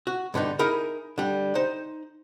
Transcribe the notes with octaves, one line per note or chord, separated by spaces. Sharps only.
F#4
G2 D3 B3 D#4
D#4 E4 G#4 A#4 B5
D3 G3
D#4 C5